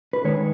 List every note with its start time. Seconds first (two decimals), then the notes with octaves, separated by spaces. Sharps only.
0.13 B4
0.25 D#3 G#3 D#4 C#5